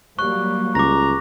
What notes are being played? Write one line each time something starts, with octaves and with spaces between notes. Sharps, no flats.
F#3 G3 A#3 C#6 F#6
C#2 A#5 D6 A#6